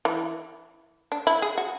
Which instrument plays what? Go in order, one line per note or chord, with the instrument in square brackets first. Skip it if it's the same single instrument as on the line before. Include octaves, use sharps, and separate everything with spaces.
[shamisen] E3
D4
E4
G#4
F#4